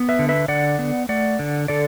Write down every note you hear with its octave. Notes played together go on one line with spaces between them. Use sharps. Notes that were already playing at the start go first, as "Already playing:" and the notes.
Already playing: B3
B4 E5
D3
B4 E5
D3 D5 F#5
B3
A3 D5 F#5
D3
D3 A4 D5